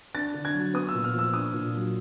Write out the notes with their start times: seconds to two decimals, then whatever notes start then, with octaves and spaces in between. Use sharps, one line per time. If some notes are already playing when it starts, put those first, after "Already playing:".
0.15 D4 A6
0.34 D3
0.45 G#6
0.54 F#3
0.74 B3 D#6
0.89 E6
0.94 A#2
1.04 F6
1.14 F3
1.19 E6
1.34 D4 D#6
1.53 A#2
1.73 F#3